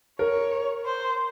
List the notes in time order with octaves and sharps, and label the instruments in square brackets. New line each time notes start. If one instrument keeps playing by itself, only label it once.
[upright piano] A#4 [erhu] C#5
[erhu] C5